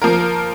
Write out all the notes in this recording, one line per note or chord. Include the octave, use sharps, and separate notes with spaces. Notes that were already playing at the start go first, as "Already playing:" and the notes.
F3 A#3 F4 A#4